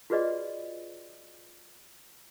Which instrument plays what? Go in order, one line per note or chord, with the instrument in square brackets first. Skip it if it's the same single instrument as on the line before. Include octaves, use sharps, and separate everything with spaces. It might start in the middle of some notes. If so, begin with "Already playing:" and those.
[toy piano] F4 F#4 G#4 B4 D5 D#5